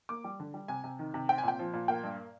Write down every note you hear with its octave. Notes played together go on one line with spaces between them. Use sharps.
A#3 D6
G3
D3
G3
C3 G#5
C3
D#3
C3
C4 G5
G#5
A#2 G5
F3
A#2
A#3 G5
G2